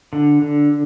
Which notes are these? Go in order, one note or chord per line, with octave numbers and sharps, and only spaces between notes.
D3
D3